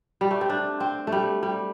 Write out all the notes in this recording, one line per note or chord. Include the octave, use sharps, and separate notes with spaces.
G3
A3
C4
D4
C4
A3
G3
G3